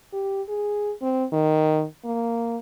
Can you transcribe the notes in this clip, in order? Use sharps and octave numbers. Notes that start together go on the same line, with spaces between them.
G4
G#4
C4
D#3
A#3